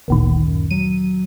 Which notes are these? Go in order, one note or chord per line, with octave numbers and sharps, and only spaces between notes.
G1 D2 A#2 D#3
F#2
F#3 D#7